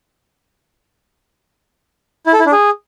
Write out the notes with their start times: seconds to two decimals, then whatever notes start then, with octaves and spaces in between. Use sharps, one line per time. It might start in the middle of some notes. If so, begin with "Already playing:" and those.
2.27 E4
2.33 A4
2.39 E4
2.46 D4
2.52 G#4